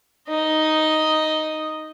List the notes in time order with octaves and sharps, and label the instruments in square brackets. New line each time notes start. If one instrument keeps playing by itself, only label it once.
[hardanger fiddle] D#4 D#5